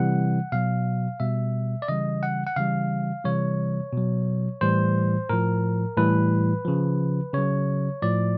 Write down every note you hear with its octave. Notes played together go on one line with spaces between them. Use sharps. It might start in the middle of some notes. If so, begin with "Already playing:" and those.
Already playing: C3 E3 G3 F#5
B2 F#3 F5
B2 G3 E5
D5
C#3 E3 G3 D#5
F#5
F#5
C#3 E3 G3 F5
C3 E3 G3 C#5
B2 F#3
A2 E3 G3 C5
A2 F3 A#4
A2 E3 G3 B4
C#3 F3
C#3 F#3 C#5
A2 F3 D5